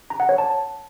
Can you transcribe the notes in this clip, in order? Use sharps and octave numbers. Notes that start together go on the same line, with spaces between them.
A#5
F#5
C#5
A5